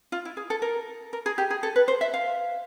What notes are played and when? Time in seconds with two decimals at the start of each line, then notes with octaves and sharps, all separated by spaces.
0.12 F4
0.25 E4
0.37 G#4
0.50 A4
0.62 A#4
1.13 A#4
1.26 G#4
1.38 G4
1.50 G#4
1.63 A4
1.76 B4
1.88 C5
2.01 E5
2.14 F5